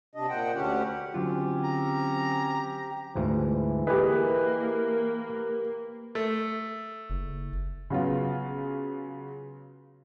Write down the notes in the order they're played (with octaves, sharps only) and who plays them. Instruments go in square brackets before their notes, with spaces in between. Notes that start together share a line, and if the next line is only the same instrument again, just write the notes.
[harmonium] C3 D4 D#5
A#2 C5 F#5 G5
D2 D3 C#4 G4 F#5
[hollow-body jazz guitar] D3 F#3 F4 [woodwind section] C4 C#4 [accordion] G4
[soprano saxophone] A#5
[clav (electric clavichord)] D2 G#2 F3 [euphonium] E3
[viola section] A#3 [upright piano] G4 B4 [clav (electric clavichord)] G#4 D#5
[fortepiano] A3
[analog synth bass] F#1
[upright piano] C#3 F#3 B3 F4